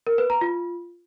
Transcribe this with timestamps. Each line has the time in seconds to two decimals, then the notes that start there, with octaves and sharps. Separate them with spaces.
0.07 A#4
0.18 B4
0.30 A#5
0.41 F4